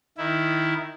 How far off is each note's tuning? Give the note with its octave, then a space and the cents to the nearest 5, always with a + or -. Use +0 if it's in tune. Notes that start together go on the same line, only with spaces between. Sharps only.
D#3 +0 E4 +0